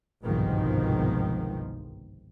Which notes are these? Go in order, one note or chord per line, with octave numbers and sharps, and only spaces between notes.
G1 C2 G#2 B2 D#3 F3